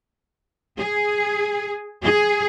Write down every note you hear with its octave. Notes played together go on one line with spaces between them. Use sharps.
G#4
G#4